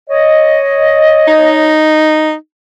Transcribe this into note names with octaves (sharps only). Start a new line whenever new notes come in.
C#5 D#5
D#4